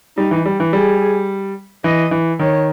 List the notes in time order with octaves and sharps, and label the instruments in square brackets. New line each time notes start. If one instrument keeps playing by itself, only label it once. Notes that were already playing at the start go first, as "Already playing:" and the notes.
[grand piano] G3 [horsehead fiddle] D#4
[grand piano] E3
G3
E3
[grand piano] G3 [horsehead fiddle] G#4
[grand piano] E3 [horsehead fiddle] D#5
[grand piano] E3
[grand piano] D#3 [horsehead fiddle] C#5